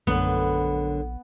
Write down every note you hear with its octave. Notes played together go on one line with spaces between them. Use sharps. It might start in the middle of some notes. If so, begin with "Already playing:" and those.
A#1 F#2 D3 A3 B3